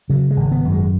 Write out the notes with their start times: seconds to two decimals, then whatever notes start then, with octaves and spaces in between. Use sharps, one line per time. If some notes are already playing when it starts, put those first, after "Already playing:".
0.09 C#3 F#3
0.31 G#3
0.37 G#1
0.52 B3
0.65 F#2
0.72 G#3